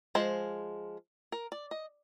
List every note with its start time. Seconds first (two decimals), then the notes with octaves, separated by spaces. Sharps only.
0.15 F3 G#3 C5
1.32 A#4
1.52 D5
1.71 D#5